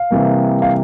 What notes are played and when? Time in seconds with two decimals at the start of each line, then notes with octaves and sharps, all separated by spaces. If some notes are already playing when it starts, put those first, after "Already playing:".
Already playing: F5
0.11 C3 E3 G3 A#3
0.62 F5